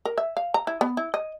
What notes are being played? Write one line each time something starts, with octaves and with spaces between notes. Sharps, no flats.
A#4
E5
F5
A#5
E4
B3
E4
D#5